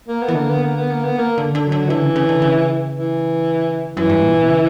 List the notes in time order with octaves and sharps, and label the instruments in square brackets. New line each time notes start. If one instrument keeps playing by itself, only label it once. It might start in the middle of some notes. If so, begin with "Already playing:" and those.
[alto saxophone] A#3
B3
[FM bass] E3
[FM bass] D3 [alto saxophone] A#3
[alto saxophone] B3
A#3
B3
A#3
B3
A#3
[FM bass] D3
D3
[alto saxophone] F#3
[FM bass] D3
[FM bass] D3 [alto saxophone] E3
[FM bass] C#3
C#3
D3
C#3
[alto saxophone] E3
[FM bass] F#2 [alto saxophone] E3
[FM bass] G2
A#2
B2
C#3